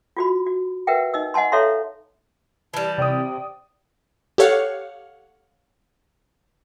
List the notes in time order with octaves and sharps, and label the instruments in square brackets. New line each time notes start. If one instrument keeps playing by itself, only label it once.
[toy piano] F4 F#4 B5
F#4
A#4 B4 E5 F#5 G5
D#4 D#5 E6
D#5 F#5 G#5 A5 C6
A4 C#5 E5 F5 A#5 C6
[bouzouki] E3 G3 [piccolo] A5
[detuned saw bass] C3 [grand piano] D5 D#6 [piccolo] G5
[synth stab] G4 A4 C#5 F5 F#5